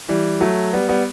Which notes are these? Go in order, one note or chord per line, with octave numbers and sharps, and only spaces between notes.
E3 G3
F#3 A3
G3 B3
G3 B3